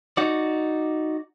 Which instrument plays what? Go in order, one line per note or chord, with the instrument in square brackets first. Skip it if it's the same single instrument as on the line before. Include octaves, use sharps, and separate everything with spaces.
[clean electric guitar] D#4 F#4 D5